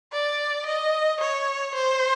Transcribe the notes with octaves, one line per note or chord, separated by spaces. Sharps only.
D5
D#5
C#5
C5